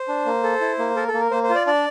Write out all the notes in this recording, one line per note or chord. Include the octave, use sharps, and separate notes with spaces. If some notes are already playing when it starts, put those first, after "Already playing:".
Already playing: C5
D4
A#3
A4
E4
A#3
A4 A#4
A4
A#3
A#4
A#3 C5
C5
F4
D5
D4 D5